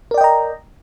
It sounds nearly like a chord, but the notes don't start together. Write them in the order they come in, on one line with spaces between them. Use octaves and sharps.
A#4 D5 G5 D#5 A#5